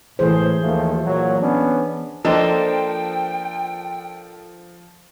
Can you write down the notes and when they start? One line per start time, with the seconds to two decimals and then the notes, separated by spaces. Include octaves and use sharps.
0.19 A2 E3 G#4 C5
0.61 D#2 F3 A3
1.05 A#2 F#3
1.40 B3 C#4 D4
2.25 F3 A#3 D4 A4 C5 D#5 G5